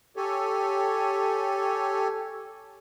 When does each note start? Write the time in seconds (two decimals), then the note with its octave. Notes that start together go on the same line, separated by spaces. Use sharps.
0.17 G4 A4 C#5 G#5